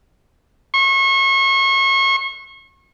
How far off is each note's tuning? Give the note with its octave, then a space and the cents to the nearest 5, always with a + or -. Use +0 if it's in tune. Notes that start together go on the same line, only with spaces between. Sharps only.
C#6 -35